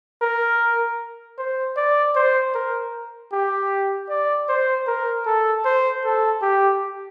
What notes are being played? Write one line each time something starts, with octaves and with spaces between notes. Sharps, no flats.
A#4
C5
D5
C5
A#4
G4
D5
C5
A#4
A4
C5
A4
G4